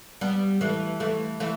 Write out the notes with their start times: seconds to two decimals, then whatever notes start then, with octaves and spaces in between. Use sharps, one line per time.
0.21 G3 B3
0.61 E3 A3
1.00 E3 A3
1.40 E3 A3